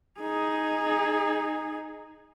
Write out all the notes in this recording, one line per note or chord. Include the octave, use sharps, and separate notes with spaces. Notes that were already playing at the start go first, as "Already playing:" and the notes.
D#4 G#4